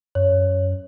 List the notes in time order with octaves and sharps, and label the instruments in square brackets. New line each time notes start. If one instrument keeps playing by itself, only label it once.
[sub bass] F#2 [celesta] C#5